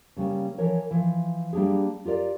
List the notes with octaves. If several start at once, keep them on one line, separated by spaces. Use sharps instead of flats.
C#3 G3 A#3 C#4
E3 F3 A#4 C#5
E3 F3
G3 A#3 D4 G4 G#4
F4 G4 A#4 D5